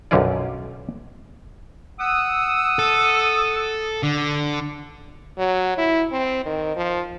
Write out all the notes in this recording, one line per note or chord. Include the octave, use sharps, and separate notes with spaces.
B1 F#2 D3 C#4 F4 D5
F#5 D#6 E6
A4
D3
F#3
E4
C4
D#3
F3